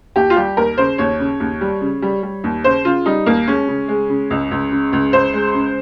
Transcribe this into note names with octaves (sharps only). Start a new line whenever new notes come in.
D#2 G4
F4
G3 G4
D#2 A#4
C#3 C5
D#2 C#5
C#3
D#2
G3
C#3
G3
G3
D#2
C#3 C5
C#3 F4
G3 D#4
D#2 A#3
G#3 C#4
C#3
G#3
C#3
C#2
C#2
C#3
C#2
C#2 C5
G#3
C#3